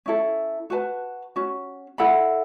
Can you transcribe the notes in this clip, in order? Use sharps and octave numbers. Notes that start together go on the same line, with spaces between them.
C#4 E4 A4
F#4 B4 A5
C#4 F#4
E4 A4 F#5 B5